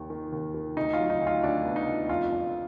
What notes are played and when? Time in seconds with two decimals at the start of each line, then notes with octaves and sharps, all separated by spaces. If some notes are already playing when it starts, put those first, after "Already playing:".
Already playing: D#2 D#3
0.10 D#3
0.32 D#2
0.54 D#3
0.77 D2 D#4
0.93 F4
0.99 F#3
1.10 D#4
1.21 D2
1.27 F4
1.43 D2 D4
1.65 B3
1.76 D#4
1.87 D2
2.09 F2 F4
2.32 F2